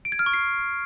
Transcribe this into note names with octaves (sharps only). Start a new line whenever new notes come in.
D7
G#6
F6
C#6
C7